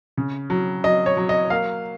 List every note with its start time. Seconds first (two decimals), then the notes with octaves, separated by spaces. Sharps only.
0.17 C#3
0.50 F#3
0.84 F#3 D#5
1.06 C#5
1.17 F#3
1.29 D#5
1.50 A#3 F5